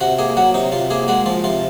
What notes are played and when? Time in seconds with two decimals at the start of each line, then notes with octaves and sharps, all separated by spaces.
0.01 C3 F#4
0.19 A#3 G#4
0.37 F#3 F#4
0.54 C3 D#4
0.72 C3 F4
0.90 A#3 G#4
1.08 G#3 F#4
1.26 F3 F4
1.44 C3 F4